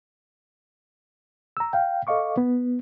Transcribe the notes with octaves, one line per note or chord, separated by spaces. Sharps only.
A#5 E6
F5 G5
A4 D#5 F5 C#6 D6
B3